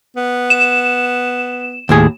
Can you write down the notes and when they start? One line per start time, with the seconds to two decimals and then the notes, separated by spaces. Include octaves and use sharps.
0.16 B3
0.50 E7
1.89 D#2 A2 G#4